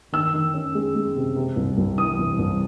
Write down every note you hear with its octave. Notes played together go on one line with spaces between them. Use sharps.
D#3 E6
D#3
C#4
G#3
G#3
C3
C3
C2
C2
E3 D#6
C2
C2